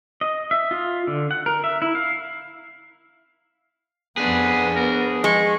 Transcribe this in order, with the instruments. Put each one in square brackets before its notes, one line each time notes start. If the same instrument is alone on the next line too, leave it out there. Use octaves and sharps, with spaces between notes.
[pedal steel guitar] D#5
E5
F4
D3
F#5
A#4
E5
E4
F5
[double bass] F2 B3 [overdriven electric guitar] D4 G#4 [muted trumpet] B4
[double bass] B3 [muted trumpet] A#4
[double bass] F3 [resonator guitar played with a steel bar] G#3 [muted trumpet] C#6